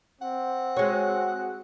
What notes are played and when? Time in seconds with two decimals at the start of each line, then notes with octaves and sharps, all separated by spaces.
0.22 C4 F#5
0.77 G#3 F#4 C#5